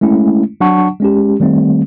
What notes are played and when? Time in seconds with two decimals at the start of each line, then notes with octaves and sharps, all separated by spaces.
0.01 G#3 A3 C#4 E4
0.61 F#3 D4 F#5 A5 C#6
1.00 G#3 C#4 G4
1.40 D#3 G3 A3 C4